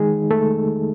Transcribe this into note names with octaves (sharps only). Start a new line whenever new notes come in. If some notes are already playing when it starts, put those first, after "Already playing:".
Already playing: D#3 G#3 D#4 G#4
A3 A4